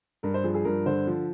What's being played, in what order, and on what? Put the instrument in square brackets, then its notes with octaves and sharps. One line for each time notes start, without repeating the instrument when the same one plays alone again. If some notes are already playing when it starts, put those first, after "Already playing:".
[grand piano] G2 A#4
C5
F3 G#4
G#4
G2 A#4
D3 C5
F3